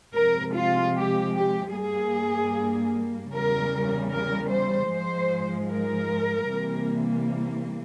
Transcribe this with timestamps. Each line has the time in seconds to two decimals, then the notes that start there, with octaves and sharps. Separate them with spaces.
0.14 C3 F3 G#3 A#4
0.54 F4
0.95 G4
1.35 G4
1.74 G2 G3 A#3 G#4
3.33 E2 C#3 G3 A#4
4.13 A#4
4.51 C5
4.92 G#2 F3 G#3 C5
5.71 A#4
6.50 C3 E3 G3 A#3